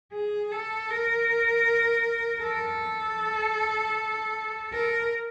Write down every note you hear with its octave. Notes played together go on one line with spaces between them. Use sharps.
G#4
A4
A#4
A4
A#4